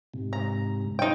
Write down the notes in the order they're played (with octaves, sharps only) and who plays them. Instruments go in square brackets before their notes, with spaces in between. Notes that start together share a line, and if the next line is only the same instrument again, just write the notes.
[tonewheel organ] G#2 C3
[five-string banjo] A#5
D#4 G5